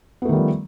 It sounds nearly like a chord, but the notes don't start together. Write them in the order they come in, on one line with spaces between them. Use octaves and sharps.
B3 A3 D#3 G3 F3